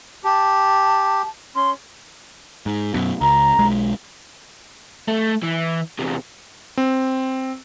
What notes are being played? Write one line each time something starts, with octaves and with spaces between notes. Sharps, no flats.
G4 A5
C#4 C6
G#2
F#2 B2
C#2 A#5
B1 G#3
A3
E3
E2 C3
C4